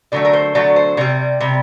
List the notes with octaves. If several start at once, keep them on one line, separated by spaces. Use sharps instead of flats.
D3 F#3 A3 D5
A#4
C5
D3 F#3 A3 D5
C5
C3 G3 D5
C3 G3